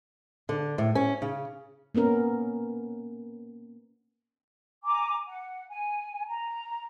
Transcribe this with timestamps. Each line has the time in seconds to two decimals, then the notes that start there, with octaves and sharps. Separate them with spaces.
0.49 D3
0.78 A2
0.95 C#4
1.22 C#3
1.95 A#3 B3 C#4 A#4
4.83 G#5 A#5 D6
5.26 F#5
5.68 G#5
6.26 A#5